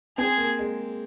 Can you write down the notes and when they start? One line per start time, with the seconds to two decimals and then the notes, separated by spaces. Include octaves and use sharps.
0.18 C4 G#4
0.38 A#3
0.59 G#3